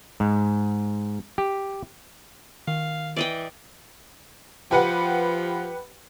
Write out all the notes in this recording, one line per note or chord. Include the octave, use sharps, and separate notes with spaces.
G#2
G4
D#3 F5
E3 D5 D#5 G5
F3 G4 B4 F#5